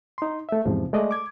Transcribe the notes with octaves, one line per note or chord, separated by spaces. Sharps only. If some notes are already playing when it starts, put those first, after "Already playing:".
D#4 C6
A3 E5
E2 G#2 C3 F3
G#3 A3 D5 D#5
D6 G#6